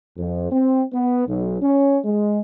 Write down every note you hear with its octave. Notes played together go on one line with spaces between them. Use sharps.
F2
C4
B3
B1
C#4
G#3